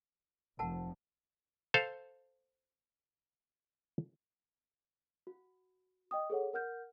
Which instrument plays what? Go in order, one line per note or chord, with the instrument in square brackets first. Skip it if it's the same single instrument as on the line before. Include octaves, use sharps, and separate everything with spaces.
[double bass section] F1 F3 [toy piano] A#4 F#5 A5
[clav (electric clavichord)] A4 C5 F5
[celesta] F#4
D#5 G5 D#6
G#4 A4 C#5 F#5
A#4 F#5 F6 G6